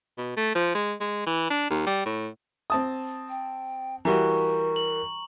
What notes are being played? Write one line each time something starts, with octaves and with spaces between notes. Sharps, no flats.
B2
A3
F3
G#3
G#3
E3
D4
D#2
G3
A2
C4 A5 D#6
G5
E3 G3 F#4 A#4 A#5 C#6
F#7